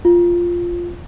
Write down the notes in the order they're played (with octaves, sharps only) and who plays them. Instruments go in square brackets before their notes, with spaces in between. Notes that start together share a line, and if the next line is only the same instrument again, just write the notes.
[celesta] F4